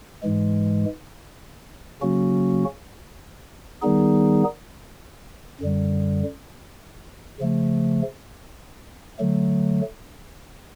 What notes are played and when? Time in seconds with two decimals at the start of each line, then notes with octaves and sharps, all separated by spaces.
0.23 G#2 E3 G#3
2.01 C#3 F#3 A#3 C#4 F#4
3.82 D#3 G3 B3 D#4 G#4
5.60 F#2 D3 G3
7.39 C#3 F3 A3
9.19 D3 F#3 A3